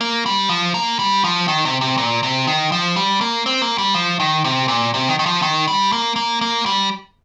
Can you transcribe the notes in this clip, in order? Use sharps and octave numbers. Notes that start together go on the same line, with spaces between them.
A#3
G3
F3
A#3
G3
F3
D#3
C3
C3
A#2
C3
D#3
F3
G3
A#3
C4
A#3
G3
F3
D#3
C3
A#2
C3
D#3
D#3
F3
D#3
G3
A#3
A#3
A#3
G3